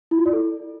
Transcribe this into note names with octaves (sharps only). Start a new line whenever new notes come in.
E4
F4
D5
A4